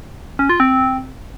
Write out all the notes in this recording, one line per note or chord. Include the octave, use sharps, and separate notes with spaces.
C#4
F4
C4